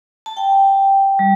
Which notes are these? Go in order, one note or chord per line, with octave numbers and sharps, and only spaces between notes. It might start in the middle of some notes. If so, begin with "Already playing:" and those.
A5
G5
G3